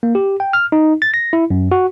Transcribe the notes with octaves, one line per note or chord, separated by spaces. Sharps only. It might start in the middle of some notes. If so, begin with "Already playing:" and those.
A#3
G4
G5
F6
D#4
A6
A#6
E4
F#2
F#4